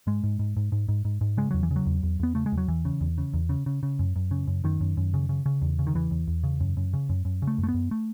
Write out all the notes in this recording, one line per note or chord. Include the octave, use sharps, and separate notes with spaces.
G#2 G#3
G#2
G#2
G#2
G#2
G#2
G#2
G#2
C#3 G#3
E2 F#3
E3
C#3
F#3
E2
E2
E2 B3
C#3 A3
G#3
E2
F#3
E2 E3
C#3
E2
C#3
E2
C#3
C#3
C#3
F#2
F#2
C#3
F#2
F#2 D#3
F#2
F#2
C#3
C#3
C#3
E2
C#3
D#3
E2 E3
E2
E2
C#3
F#2
F#2
C#3
F#2
F#2
C#3
A3
F#2
A3
B3
F#2
A3